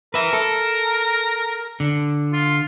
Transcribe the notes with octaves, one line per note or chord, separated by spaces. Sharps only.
A#4 B4 E5
A4
D3
F4